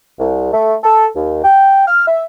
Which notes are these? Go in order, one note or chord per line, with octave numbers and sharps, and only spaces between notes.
C2
A3
A4
D#2
G5
F6
E5